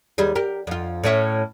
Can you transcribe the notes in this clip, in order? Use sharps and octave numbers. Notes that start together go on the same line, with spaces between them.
D#2 G3 G#4
G4 A#4
F2 F4
A2 C#4 E5